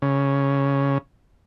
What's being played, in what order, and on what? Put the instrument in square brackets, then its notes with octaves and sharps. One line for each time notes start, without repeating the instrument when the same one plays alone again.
[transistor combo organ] C#3